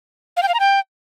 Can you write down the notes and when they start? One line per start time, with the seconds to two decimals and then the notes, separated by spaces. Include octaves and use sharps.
0.37 F5
0.43 G5
0.48 F5
0.54 A#5
0.60 G5